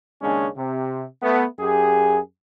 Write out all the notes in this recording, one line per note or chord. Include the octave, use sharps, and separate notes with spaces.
D#2 C#3 G#3 C#4 D4
C3
A3 B3
F#2 G4 G#4